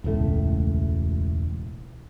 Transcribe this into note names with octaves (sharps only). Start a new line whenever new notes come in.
E1 C#2 A2 A3